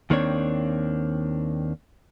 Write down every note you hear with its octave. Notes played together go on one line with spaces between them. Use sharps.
D#2 D#3 A#3 C4 D4 C#5